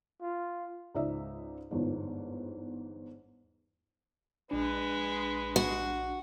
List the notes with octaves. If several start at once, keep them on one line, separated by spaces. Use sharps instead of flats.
F4
C#2 G#2 D#4 D5 E5
G1 E2 G#2
A#1 G#3 D4 B4
F#4